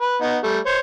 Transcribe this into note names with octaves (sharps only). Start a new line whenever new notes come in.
B4
B3 D#4
G3 A3
C5 C#5